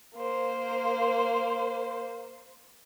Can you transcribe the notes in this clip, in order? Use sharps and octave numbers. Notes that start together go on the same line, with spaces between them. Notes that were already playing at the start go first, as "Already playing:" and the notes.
A#3 C5